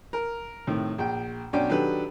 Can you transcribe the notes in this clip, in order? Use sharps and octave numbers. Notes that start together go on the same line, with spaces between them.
A#4
A2 C3 D#3
A#1 G5
B1 C#4 D4 D5 G5
D#3 F#3 D4 G4 A4 B4